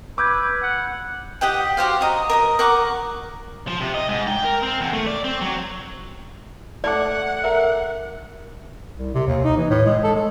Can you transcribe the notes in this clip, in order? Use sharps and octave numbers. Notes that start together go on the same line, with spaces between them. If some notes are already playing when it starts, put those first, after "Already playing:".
B4 D6 E6 G6 G#6
F#5
G4 D#5 F#5 G5
F#4 G4 C5 F5
F#4 D#5 A#5
A#4 D#5 D#6
A#4 F#5 C#6 D6
F3
C3
D#5
G#2
G5
A#4
C4
E2
A3
D5
C4
F#3
A3 D5 F#5 A5 D6
A#4 E5
C2
C3
D#2
D#4
E3
A2
G#3
A4
G#3